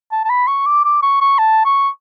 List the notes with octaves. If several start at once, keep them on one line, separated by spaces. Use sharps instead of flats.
A5
A5
B5
C#6
D6
D6
C#6
C#6
A5
C#6